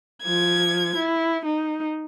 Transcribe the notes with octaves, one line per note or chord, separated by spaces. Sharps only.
F3 G#6
E4
D#4